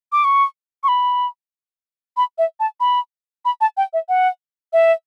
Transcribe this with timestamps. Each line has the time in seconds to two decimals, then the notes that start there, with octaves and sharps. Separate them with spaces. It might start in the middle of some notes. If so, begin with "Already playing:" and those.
0.12 D6
0.24 C#6
0.84 C#6
0.88 B5
2.17 B5
2.38 E5
2.60 A5
2.80 B5
3.45 B5
3.61 A5
3.77 G5
3.93 E5
4.09 F#5
4.73 E5